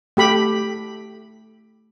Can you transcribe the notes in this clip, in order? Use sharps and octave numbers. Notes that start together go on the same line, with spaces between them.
A3 G4 B5